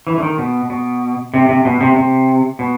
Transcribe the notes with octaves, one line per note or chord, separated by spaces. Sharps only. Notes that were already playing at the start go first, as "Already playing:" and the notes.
E3
D3
D#3
B2
B2
C3
C3
B2
C3
C3
B2